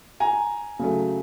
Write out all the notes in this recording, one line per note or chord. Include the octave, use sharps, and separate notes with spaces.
G#5 A#5
C#3 F#3 A3